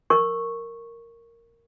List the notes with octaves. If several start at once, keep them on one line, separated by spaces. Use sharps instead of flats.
A#4 C#6